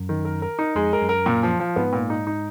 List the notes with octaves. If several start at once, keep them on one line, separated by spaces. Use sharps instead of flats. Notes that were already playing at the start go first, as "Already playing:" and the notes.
Already playing: F#2
D#3
A#4
A#4
D#4
F2 G#3
A#4
F#2
A#4
A#2
F3
F3
G#2 B3
A#2
D#4
D#4